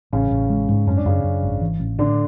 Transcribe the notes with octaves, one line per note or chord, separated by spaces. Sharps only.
A1 C#3 C#4
A1
G#3
G#2
F#2 C#4
D4
F#2 C#3 C#4
F#2
G#1
E3
A1
A2 D3 D4